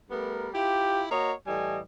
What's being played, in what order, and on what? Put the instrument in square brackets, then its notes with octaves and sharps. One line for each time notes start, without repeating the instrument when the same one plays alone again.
[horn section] G3 A3 B3 A#4
E4 F4 G4
A#3 F#4 C#5 D#5
A2 E3 G3 D#5 G#5